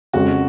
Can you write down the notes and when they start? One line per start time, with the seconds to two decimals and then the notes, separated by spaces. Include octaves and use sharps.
0.13 F2 C#3 G#3 C#4 F#4